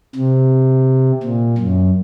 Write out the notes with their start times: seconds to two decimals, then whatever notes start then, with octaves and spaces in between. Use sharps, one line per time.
0.16 C3
1.23 A#2
1.58 F#2